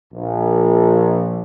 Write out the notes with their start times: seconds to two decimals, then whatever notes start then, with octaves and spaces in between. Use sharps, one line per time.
0.13 A#1